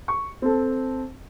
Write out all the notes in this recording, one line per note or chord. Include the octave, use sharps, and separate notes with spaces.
C#6
C4 A4